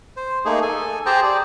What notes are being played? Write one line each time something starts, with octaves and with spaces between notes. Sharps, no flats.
C5
A3 A#3 D#4 G#4
A4 G#5
G4 G#4 C5 G5 A5 A#5
D5